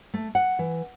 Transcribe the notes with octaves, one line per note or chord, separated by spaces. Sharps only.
A3
F#5
E3